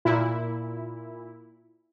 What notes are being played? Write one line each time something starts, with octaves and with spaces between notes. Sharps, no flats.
A#2 E4